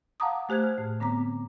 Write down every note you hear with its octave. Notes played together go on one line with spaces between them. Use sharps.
F5 F#5 A5 A#5 D6 D#6
A3 G4 C5 F#6 G#6
F6
A2
D3 B3 C4 A#5 D6